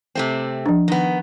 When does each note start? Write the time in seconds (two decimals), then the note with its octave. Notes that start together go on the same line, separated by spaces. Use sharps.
0.15 C3 A3 C4
0.66 F3 D4
0.88 D#3 B3